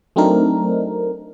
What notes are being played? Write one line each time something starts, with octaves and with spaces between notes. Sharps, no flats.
F#3 A3 C4 D4 D#4 A#4